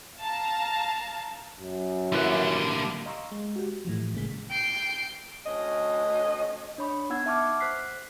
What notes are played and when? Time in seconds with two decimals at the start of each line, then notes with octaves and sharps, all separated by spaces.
0.19 F5 A5 A#5
1.61 F#2
2.12 D3 G3 A#3 E4 B4
3.06 D#5 F5 A#5 C6 C#6 E6
3.32 G#3
3.56 F#4 G4
3.85 A2 E3 F3
4.13 G1 A#2 C#3 G#3 B6
4.51 G5 C7
5.46 D2 C#4 D#5
6.78 D4 C#5 B5 C#6
7.10 B3 D#4 F#5 E6 G#6
7.26 E5 F#5 A5 C#6 D6 F6
7.60 C5 F#6 B6 C7